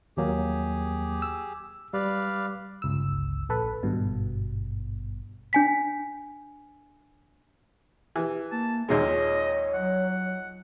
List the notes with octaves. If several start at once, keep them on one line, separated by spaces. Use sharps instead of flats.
D#2 F#3 A#3 G4 G#4
E6
G3 B4 D5 F5
G1 C#2 E6
A#1 A4 B4
G#1 G2 B2
D4 G#5 B6
E3 G4
A#3 A5
D#2 A#2 G#3 C#5 D#5
F#3 F#5